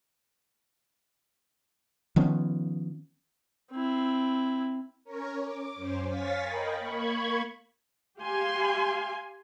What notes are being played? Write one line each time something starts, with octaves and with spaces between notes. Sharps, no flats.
D#3 F3 B3 C#4
C4 E4
C#4 A#4 C#5
D6
F#2 C#4 C5
C#5 F5 G#5 C#6 A6 B6
A#4 D#5 G5 B5
A#3 B5 C#6 G#6
G4 F5 G#5 C6